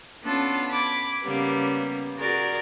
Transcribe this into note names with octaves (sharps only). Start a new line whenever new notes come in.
B3 C#4 D4 F4 A4
B5 D6 G#6
C#3 G3 A#3 B3
F#4 G#4 A#4 D5